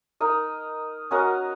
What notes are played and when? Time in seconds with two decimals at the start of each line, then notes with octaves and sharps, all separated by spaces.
0.20 D#4 A#4 D#5
1.11 C#4 F#4 A#4 D#5